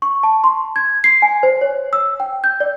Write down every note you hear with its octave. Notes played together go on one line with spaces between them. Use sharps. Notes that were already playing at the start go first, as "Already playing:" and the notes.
C#6
A5
C6
G#6
C7
G#5
C5
C#5
E6
G5
G6
D5